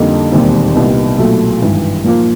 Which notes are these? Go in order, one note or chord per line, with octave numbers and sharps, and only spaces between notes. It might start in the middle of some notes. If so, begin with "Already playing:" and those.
Already playing: F2 D3 G3 A#3 D#4
E1 D#2 D#3 G3 C4
C2 A#2 G3 B3 D#4
B1 A#2 F#3 A3
G#1 G2 E3 G3
A#2 F3 A#3